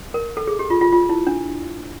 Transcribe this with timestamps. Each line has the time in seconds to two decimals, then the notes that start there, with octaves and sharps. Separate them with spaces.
0.14 A#4
0.37 A4
0.47 G#4
0.59 G4
0.70 F4
0.81 F4
0.92 F4
1.09 E4
1.27 D4